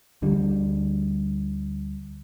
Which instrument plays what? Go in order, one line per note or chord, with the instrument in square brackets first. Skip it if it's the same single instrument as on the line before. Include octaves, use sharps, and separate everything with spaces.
[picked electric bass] D2 D3 G3